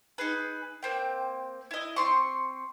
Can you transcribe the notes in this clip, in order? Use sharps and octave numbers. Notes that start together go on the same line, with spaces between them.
D#4 G#4 B4
A#3 C4 G5
E4 D#5
C4 C6 C#6